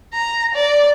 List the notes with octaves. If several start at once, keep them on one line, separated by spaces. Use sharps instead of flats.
A#5
D5